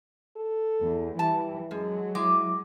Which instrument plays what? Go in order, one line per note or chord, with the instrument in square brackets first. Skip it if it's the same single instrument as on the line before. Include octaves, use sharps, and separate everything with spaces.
[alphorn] A4
[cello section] E2
[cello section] E3 [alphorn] G3 [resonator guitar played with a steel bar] A5
[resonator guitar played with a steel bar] F#2 [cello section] F#3 [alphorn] G#3
[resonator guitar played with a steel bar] G#3 [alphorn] E4 [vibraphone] D6